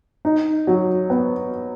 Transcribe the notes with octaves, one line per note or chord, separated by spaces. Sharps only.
D#4
F#3
B3